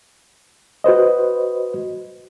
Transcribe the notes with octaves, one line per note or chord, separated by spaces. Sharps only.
F#4 B4 C5 D#5